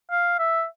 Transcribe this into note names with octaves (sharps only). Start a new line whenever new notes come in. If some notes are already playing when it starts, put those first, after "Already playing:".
F5
E5